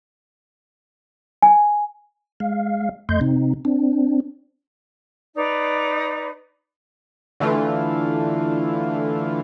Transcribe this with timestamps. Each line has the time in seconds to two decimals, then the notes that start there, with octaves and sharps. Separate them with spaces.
1.42 G#5
2.40 G#3 F5
3.09 F2 A3 D#5 C6 G6
3.21 C3 C4 D#4
3.65 C4 D4
5.35 D#4 B4 D5
7.40 D3 E3 A3 F4